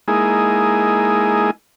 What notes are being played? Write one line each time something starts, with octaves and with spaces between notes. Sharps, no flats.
G#3 A#3 D#4 E4 G#4